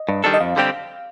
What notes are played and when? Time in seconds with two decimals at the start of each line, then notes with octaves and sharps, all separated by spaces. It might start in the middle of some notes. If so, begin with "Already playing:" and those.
Already playing: D#5
0.09 G2
0.24 D#3 G3 D4 A4
0.34 D#5
0.40 F2 F5
0.56 D3 G3 C4 G4